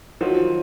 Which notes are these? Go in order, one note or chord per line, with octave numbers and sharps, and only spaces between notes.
D#3 F3 F#3